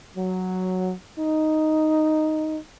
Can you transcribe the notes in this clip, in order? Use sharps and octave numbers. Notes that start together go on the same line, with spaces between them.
F#3
D#4